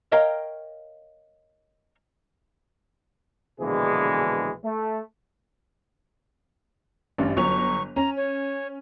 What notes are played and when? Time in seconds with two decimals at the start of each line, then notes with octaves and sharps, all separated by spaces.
0.12 A#4 C#5 D#5 F5 G5 A#5
3.60 A#1 B2 D3 E3 G#3 G#4
4.64 A3
7.18 A1 G2
7.37 G1 F#3 C#6 F7
7.96 C#4 A#5
8.17 C#5